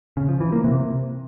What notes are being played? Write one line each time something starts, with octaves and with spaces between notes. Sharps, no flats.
C#3
F3
E3
A#3
C3